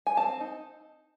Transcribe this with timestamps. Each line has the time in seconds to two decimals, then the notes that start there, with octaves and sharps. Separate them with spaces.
0.07 G#5
0.17 C4 A5
0.40 D#4